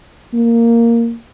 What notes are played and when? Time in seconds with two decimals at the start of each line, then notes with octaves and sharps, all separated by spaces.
0.34 A#3